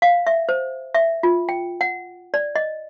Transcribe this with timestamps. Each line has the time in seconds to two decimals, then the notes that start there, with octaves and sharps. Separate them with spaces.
0.02 F5
0.27 E5
0.49 C5
0.95 E5
1.23 F4
1.49 G5
1.81 F#5
2.34 D5
2.56 D#5